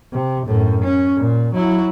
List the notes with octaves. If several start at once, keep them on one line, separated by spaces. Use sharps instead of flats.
C3
F#2 A2
C#4
A#2
F#3 E4